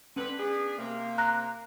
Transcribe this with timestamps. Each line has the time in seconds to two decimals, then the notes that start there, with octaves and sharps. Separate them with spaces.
0.16 D3 C4 C#4 B4
0.38 B3 D4 G#4
0.78 C3 A#3
1.18 A#5 F#6 A#6